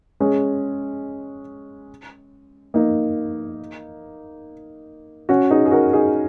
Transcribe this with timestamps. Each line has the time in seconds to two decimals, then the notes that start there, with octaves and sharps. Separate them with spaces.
0.20 G#3 C#4
2.74 A#3 D#4
5.29 C#4 F#4
5.51 D#4 G#4
5.66 G#4
5.71 F#4 A#4
5.93 D#4 G#4